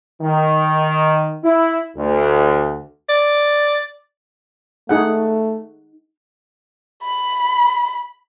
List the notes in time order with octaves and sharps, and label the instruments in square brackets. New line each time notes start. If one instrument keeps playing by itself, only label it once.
[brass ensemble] D#3
E4
D2
[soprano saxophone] D5
[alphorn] A3 [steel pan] D#4 G#4 F#5
[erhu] B5